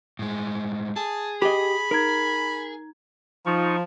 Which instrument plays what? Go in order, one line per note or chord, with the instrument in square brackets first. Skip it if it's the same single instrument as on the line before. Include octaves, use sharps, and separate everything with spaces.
[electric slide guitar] A2 G#3
[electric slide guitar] G#4 [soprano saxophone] A5
[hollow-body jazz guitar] G4 D#5 [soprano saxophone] B5
[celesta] D#4 A#5 G#6 [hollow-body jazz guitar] A#4
[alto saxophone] F3 [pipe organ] D#4 F4 C#6